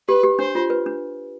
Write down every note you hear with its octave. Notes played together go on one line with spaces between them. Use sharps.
G4 B4
G4
D4 C5
F4
B4
D4